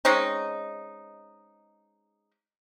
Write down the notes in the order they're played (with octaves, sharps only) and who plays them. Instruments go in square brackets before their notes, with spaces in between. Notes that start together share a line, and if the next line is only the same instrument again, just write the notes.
[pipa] G#3 C4 C#4 D#4